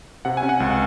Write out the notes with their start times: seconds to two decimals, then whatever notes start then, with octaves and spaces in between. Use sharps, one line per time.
0.25 C3 F#5
0.37 G#5
0.43 C#4
0.49 F#5
0.60 C#2